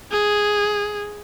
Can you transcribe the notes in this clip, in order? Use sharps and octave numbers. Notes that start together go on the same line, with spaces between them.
G#4